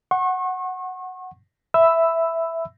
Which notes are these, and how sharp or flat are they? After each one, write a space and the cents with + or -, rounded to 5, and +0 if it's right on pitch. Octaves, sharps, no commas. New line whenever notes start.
F#5 +0 C#6 -35
E5 +0 B5 +10 E6 +0